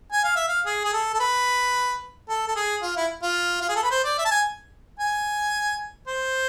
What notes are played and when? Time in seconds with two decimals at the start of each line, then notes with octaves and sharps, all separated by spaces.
0.12 G#5
0.24 F5
0.36 E5
0.48 F5
0.66 G#4
0.84 G#4
0.93 A4
1.14 A4
1.20 B4
2.29 A4
2.48 A4
2.56 G#4
2.82 F4
2.97 E4
3.22 F4
3.62 F4
3.69 G#4
3.76 A4
3.83 B4
3.91 C5
4.04 D5
4.18 E5
4.25 A5
4.31 G#5
4.99 G#5
6.07 C5